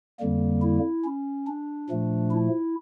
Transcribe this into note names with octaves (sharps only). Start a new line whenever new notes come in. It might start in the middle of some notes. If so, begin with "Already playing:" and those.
F2 D3 G3 A#3
E4
C#4
D4
A#2 F3 A3
E4